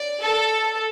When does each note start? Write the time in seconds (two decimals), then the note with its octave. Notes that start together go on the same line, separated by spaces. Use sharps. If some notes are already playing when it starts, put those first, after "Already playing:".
Already playing: D5
0.22 A4